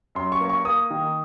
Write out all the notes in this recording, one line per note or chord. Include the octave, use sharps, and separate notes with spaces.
F#2 C6
C#6
A#3
C#6
A#3 D#6
D#3